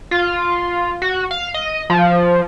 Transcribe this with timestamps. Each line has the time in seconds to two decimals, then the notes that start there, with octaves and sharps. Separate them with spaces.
0.11 F4
1.02 F#4
1.31 F5
1.54 D#5
1.90 F3